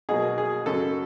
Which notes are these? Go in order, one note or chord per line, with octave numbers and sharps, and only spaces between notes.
B2 F#3 A#3 G#4
G#4
F#2 C#3 F#3 A4